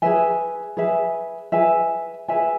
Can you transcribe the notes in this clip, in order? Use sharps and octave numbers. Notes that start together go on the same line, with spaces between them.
G#4 B4 E5 G#5
G#4 B4 E5 G#5
G#4 B4 E5 G#5
G#4 B4 E5 G#5